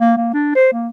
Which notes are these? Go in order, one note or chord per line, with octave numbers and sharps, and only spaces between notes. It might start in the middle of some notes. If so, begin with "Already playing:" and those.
A#3
A#3
D4
C5
A#3